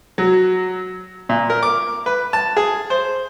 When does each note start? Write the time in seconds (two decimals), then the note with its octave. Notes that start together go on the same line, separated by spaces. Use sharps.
0.18 F#3
1.29 A#2
1.50 A#4
1.63 D6
2.06 B4
2.33 A5
2.57 G#4
2.90 C5